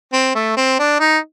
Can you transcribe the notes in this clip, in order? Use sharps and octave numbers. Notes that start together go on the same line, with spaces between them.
C4
A3
C4
D4
D#4